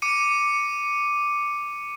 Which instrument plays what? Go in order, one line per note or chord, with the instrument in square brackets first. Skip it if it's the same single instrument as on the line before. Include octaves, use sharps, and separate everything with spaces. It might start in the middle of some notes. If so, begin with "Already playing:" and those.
[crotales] D6 C#7 D#7